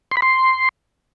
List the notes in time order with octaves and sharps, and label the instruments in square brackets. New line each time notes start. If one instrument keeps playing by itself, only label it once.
[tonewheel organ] C6
B5
C6